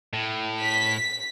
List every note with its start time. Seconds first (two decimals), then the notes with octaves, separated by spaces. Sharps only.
0.13 A2
0.60 B6